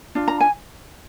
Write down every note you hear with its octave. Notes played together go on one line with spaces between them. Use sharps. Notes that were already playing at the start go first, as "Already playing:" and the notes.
D4 F4
A#5
G#5